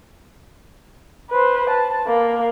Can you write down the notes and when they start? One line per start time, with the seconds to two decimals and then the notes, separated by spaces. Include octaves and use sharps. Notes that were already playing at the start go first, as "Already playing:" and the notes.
1.31 B4 C5
1.70 A5
2.07 A#3